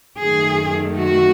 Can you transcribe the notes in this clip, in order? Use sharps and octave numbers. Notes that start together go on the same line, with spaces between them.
F#2 D#3 A3 G#4
F#4